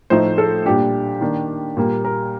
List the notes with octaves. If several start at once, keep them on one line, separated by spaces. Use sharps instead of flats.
A2 F3 A3 D#4 C5
A4
A#2 G3 D4 G4
D#3 A#3 D4
A#2 G3 A#3
A#4